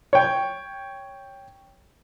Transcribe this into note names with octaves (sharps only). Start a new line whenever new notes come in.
C#5 G5